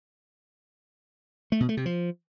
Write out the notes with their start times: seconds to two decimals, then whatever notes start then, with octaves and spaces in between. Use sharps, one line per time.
1.52 A3
1.60 B2
1.69 A3
1.77 C3
1.86 F3